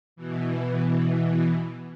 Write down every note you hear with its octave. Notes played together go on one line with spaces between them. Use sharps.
B2 E3